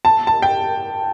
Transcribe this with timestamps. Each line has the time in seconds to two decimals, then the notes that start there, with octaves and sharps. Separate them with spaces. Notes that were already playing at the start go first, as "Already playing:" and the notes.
0.05 A5
0.27 A5
0.42 G5